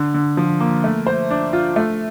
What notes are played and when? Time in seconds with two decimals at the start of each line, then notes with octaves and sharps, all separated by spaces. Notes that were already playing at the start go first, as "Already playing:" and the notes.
Already playing: D3
0.14 D3
0.37 F3
0.60 A#3
0.84 A3
1.07 C5
1.31 D4
1.53 F4
1.76 A3